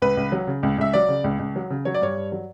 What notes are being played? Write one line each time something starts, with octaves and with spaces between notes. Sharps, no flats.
C#2 B4
C#2
F#3
C#3
C#2
C#2 E5
F#3 D5
C#3
C#2
C#2
F#3
C#3
F#3 C#5
D5
G2 C#5
G2
F#3